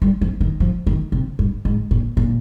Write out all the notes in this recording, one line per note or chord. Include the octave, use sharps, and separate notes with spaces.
G3
F3
D#3
F3
D#3
C3
G2
G#2
A#2
A#2